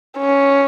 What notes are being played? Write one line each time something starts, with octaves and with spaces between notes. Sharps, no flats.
C#4